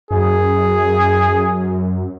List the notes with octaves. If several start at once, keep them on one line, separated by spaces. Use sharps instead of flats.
F#2 G#4